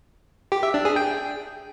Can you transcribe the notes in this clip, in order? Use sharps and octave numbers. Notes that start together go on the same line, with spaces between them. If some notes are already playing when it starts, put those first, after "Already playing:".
G4
E5
D4
G#4
G5